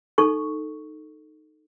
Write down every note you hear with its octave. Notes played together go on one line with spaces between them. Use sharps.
D#4 A4 C#6